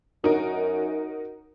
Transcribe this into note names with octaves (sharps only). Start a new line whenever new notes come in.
F#2 D#4 F#4 A#4